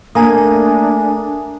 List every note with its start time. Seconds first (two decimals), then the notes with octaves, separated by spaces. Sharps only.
0.15 A3 A#3 D4 G#5 A#5 D#6